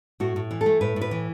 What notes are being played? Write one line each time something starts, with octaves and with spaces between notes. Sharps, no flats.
A2 F#4
A2
E3
A4
A3
A2 B4
A2
B4
E3